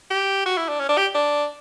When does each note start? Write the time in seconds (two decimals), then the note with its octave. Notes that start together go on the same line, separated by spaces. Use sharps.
0.11 G4
0.46 F#4
0.57 E4
0.69 D4
0.80 C#4
0.89 D4
0.98 G4
1.15 D4